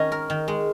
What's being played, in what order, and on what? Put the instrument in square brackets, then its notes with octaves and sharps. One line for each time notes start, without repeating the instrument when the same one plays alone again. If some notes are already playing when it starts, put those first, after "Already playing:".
Already playing: [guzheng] D#3 C#4 [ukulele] D#5
[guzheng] A#4
D#3
G#3